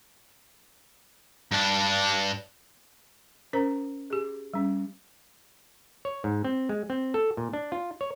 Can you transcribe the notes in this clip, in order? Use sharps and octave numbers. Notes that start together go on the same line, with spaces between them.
G2 D4
C#4 A#4 C5 A#5
G4 G#4
G3 C#4
C#5
G#2
C4
G#3
C4
A4
A#2
D4
F4
C#5